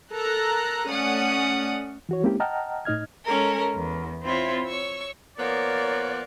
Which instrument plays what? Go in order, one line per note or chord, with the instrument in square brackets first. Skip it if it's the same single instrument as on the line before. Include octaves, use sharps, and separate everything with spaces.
[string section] A4 A#4 A#5 F#6
A3 C#4 D5 F#5 D#6
[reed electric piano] E3 F#4 C#5
G#3 A#3 C4 C#4 E4 G4
D#5 F#5 G5 A5 A#5 F6
A2 D#4 D#5 F6 G#6
[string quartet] G#3 C#4 A4 A#4
E2
C4 E4 F4 C#5 E5
C#5 C#6 E6
[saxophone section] F3 A#3 B3 [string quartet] A#4 F5 [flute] C#5 [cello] D5